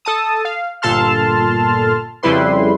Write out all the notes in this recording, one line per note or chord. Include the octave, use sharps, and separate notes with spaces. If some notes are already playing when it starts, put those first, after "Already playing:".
A4 A5 D#6
F5
G1 A#2 A4 A5 C6 F6
F2 C#3 G3 E4 B4 C6